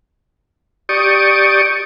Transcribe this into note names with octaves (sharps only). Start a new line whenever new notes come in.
G4 D5 C#6 D#6